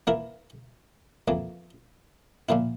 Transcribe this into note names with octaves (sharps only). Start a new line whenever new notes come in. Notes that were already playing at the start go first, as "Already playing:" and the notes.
E3 A#3 E4 A#4
F2 E3 A#3
A#2 F3 A#3 E4